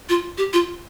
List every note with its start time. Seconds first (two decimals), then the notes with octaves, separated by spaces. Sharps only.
0.09 F4
0.38 G4
0.53 F4